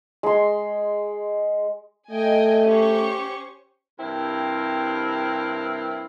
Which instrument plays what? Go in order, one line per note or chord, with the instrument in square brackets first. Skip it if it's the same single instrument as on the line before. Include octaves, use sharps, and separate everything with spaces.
[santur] G#3 C6
[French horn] A3 [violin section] D#5 G5 G#5
[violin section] C#4 C5 C#6 [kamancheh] G4
[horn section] G2 C3 C4 E4 A#4